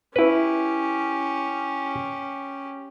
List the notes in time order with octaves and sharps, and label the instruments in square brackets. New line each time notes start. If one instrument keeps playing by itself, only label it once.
[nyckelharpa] C#4 G4 [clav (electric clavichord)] E4 B4